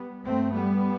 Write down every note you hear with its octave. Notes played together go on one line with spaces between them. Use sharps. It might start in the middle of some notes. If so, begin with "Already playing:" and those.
Already playing: G3 B3
G2 A3 C4
G3 B3